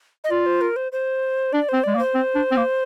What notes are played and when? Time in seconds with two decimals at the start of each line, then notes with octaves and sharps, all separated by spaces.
0.24 D#5
0.30 F4 D5
0.46 C5
0.61 A#4
0.76 C5
0.92 C5
1.53 D4 D5
1.69 C4 C5
1.84 G#3 D5
1.95 A#3
1.99 C5
2.15 C4
2.35 D4
2.51 C4
2.56 A#3